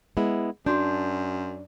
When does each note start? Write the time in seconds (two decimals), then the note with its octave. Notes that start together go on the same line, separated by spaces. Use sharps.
0.17 G#3 B3 E4
0.66 F#2 D4 F#4 C6 G6